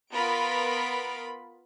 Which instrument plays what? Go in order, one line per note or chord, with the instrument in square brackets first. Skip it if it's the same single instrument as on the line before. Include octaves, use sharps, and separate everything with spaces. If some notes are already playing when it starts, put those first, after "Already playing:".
[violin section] B3 F4 A#4 B5 D7